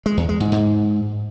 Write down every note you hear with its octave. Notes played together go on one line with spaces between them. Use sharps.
G#3
E2
G#3
G#2
G#2